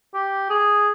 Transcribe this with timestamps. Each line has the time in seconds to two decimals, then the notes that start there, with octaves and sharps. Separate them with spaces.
0.14 G4
0.50 G#4